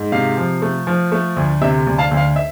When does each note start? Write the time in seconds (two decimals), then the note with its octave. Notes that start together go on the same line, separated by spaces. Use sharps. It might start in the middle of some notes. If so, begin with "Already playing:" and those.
Already playing: G#2
0.12 C3 F5
0.37 F3
0.62 A3
0.87 F3
1.12 A3
1.36 D2
1.62 C3 E5
1.87 D2
1.99 F5 A5
2.11 D2
2.17 F5
2.36 E5